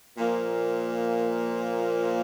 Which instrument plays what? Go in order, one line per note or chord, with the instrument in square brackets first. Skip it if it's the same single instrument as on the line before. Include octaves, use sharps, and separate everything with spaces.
[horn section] A#2 F3 A#3